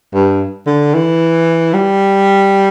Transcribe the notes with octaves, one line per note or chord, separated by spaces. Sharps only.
G2
D3
E3
G3